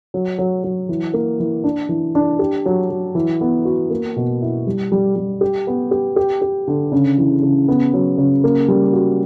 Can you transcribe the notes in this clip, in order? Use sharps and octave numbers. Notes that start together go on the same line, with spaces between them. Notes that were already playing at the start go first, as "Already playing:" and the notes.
F#3
F#3
F#3
E3
A#3
E3
D4
E3
D4
G4
F#3
F#3
E3
B3
F#4
A#3
B2
E4
G3
G3
G3
G4
B3
G4
G4
G4
D3
C#3
E3
C#3
B3
F#3
C#3
A#3
G3
F#4